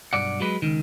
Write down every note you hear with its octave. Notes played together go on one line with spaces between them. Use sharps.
B1 G2 D5 F#5
F#3 G#3 B4
C#2 D#3